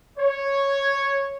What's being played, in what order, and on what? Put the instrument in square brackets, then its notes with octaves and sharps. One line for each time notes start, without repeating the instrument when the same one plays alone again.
[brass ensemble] C#5